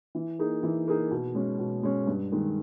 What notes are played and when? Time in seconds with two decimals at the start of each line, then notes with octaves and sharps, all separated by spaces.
0.15 E3
0.39 A#3 D#4 G#4
0.63 E3
0.87 A#3 D#4 G#4
1.11 B2
1.35 G#3 C#4
1.59 B2
1.83 G#3 C#4
2.07 G2
2.32 D#3 G#3